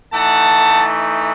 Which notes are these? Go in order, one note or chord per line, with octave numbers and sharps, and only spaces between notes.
E3 A3 D#4 F#5 A5